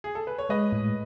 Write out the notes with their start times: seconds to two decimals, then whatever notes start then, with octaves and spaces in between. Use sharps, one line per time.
0.04 G#4
0.15 A4
0.27 B4
0.38 C#5
0.49 G#3 B4 D#5
0.72 A2